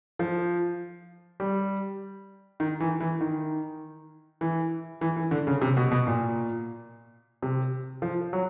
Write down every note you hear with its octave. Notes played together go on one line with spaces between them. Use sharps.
F3
G3
D#3
E3
E3
D#3
E3
E3
E3
D3
C#3
C3
B2
B2
A#2
C3
F3
F#3